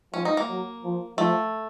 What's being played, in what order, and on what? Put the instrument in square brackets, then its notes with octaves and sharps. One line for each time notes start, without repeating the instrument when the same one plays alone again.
[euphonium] F3 [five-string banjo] C#4
[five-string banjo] D#4
A#3
[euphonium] F#3
F3
[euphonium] F3 [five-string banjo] A3